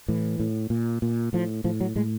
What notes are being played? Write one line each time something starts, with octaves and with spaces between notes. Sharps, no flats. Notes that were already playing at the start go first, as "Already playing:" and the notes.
A2 E3
A2
A#2
A#2
A2 F3
A2 F3
F#3
A2 G#3